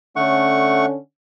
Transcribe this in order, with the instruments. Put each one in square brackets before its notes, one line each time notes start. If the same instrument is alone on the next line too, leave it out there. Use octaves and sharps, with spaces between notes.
[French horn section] D3 C#4 [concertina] A3 F#5 C#6